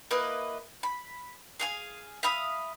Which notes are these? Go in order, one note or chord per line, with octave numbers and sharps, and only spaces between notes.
A#3 E4 B4 D#5
B5
G#4 F5 G#5
E5 F5 B5 D#6